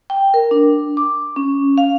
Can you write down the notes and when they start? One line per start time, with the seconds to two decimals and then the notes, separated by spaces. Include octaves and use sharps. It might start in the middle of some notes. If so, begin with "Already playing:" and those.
0.10 G5
0.34 A#4
0.51 D4
0.97 D6
1.36 C#4
1.78 F5